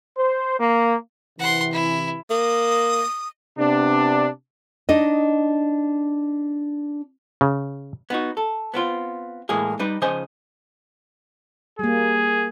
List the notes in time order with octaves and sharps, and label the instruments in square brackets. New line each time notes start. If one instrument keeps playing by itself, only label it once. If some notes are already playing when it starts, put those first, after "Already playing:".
[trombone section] C5
A#3
[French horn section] C3 E3 [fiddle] F#5 C6
[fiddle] E4
[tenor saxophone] A#3 [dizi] D#6
[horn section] C3 B3 D4
[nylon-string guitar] D4 D#4 D#5
[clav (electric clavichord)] C#3
[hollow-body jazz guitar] B3 D#4 F#4
A4
B3 C4 F4
A2 E3 G#3 A#3 G#4
G3 D#4 B4 D5
C#3 F3 C5 D#5 G#5
[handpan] G3 A#3 [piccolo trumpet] G#4